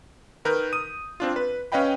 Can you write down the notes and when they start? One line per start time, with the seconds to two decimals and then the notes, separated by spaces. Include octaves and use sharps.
0.45 D#3 A#4 B4 G6
0.73 D#6 D#7
1.20 C4 D4 F4
1.36 B4
1.72 C#4 B4 D#5 F5 G5 B5